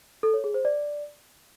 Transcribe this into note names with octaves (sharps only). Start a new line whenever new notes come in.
A4
C#5
G#4
C5
D5